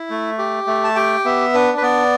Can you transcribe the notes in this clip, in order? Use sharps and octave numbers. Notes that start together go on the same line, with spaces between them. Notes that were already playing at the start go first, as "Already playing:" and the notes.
Already playing: E4
A3
G4
A3
A5
G4 G5
B3 E5
D4 B4
B4
B3 D5